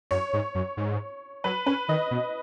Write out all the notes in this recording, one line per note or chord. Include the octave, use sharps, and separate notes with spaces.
F#2 C#5
G#2
F#2
G#2
F#3 B4
C#4 B4
D#3 D#5
B2